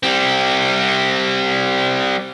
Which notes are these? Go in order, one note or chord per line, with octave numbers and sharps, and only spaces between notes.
G3 C4